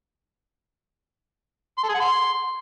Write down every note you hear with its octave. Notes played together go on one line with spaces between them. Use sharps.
C6
A4
G#4
F#5
C6